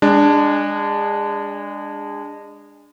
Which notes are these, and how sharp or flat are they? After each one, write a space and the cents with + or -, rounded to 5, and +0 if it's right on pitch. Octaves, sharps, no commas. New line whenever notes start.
G#3 -25 D4 +0